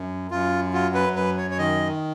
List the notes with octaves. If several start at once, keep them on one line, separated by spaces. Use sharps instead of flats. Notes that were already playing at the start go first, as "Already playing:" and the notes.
Already playing: F#2
F#2 F4
F#3 F4
B4
F#2 B4
C#5
C#5
D#3 D#5